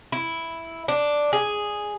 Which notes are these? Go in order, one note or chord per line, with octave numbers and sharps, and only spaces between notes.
E4
D4
G#4